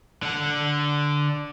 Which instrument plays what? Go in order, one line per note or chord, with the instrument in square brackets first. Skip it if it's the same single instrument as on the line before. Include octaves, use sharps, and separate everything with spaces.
[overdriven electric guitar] D3 F#5